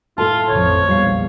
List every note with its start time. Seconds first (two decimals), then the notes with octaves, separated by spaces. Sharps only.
0.18 A2 F4 A4 A5
0.49 A1 F2 F3 C#5
0.88 A#1 E2 G3 D5 F5